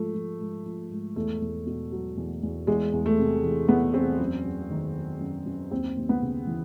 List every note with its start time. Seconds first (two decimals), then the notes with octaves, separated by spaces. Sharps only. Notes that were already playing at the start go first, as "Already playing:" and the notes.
Already playing: G#2 F3 A3
0.14 F3
0.40 G#2
0.66 F3
0.90 G#2
1.16 E2 A3
1.42 E2
1.66 B2
1.92 F#3
2.17 E2
2.43 E2
2.67 E2 G#3
2.93 E2
3.06 A3
3.19 C3
3.44 E3
3.68 E2 B3
3.94 E2 C4
4.19 F#2
4.44 F#2
4.70 D#3
4.96 F#3
5.20 F#2
5.46 F#2
5.71 D#2 C4
5.97 D#2
6.09 B3
6.22 C#3
6.47 E3